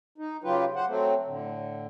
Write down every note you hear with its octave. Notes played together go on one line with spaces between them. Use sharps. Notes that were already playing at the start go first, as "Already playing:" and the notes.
D#4
C#3 F#3 F4 G4 B4
C5 F#5
F#3 A3 C4
A2 D3